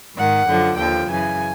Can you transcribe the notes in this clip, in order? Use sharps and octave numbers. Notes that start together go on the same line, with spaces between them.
G#2 D#3 F#5
F#2 D3 F3
D#2 D3 F3 G5
F#2 C#3 E3 G#5